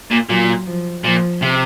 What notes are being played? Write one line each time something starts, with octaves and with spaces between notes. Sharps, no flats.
A#2
A#2 F#3
F3
A#2 F3
C3